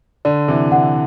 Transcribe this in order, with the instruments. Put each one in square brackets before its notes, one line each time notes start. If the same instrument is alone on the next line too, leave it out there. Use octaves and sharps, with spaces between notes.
[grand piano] D3 [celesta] D5
[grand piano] C3 E3
[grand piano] D3 [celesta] F#5